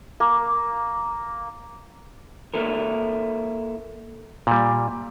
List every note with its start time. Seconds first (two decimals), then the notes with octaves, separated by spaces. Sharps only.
0.20 A#3
2.54 A#3 E4 A4 A#4
4.47 A#2 G3